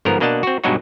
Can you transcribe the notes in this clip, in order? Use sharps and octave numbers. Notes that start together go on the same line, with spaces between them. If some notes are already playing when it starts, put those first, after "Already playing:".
G1 G#2 F3 B3 A#4
B2 A#3 D4 D#5 F#5 A5
C4 F#4
G2 B2 F#3 G#3 D#4 F#4